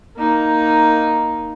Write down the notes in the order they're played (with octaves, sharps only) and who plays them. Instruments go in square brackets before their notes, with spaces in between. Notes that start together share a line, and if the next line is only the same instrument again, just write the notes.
[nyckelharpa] A#3 D#4